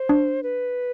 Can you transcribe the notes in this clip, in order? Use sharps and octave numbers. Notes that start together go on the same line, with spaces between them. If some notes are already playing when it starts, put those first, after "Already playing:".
Already playing: C5
D4
B4